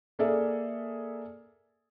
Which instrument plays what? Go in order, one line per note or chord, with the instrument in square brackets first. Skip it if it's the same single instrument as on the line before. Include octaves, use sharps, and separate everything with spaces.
[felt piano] A#3 G#4 A4 D5 E5